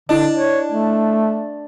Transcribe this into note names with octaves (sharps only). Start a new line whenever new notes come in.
D3 D4 E4 D#5
C#5
A3